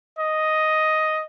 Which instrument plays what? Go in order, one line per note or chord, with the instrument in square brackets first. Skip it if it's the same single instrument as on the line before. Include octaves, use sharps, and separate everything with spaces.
[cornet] D#5